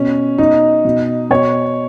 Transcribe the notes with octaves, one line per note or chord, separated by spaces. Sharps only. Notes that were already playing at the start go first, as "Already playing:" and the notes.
Already playing: B2 C#4
B2 D#4
B2
B2 C#5